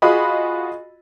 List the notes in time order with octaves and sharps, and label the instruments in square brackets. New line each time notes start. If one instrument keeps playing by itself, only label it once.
[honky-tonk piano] F4 F#4 G#4 D#5 B5